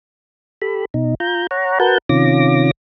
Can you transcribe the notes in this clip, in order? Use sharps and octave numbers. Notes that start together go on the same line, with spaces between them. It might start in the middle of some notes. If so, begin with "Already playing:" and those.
G4 A4 B5
B2 D#4
F4 A#5 G6
C#5 F#5 A#5
F#4 A#4 B4 F#5 A5 G6
C3 D#3 C#4 F4 D6 A#6